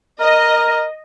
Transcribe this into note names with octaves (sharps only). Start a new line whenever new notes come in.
A#4 D#5